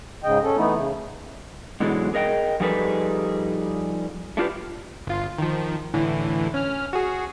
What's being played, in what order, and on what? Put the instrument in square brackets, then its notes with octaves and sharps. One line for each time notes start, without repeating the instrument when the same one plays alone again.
[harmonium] G#2 C#3 D#5 G5
C#4 A4
E3 A3 B3 D#4 E4
C#3
[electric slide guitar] G#2 B2 D3 E3 F#3 G#3
G#4 A#4 D#5 F#5 G5
F3 G3 D#4 G#4 A4 B4
A3 D4 F4 G4 B4
[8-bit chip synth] G1 F4
D#3 F3
A2 D3 E3
C#4 F6
F#4 G#4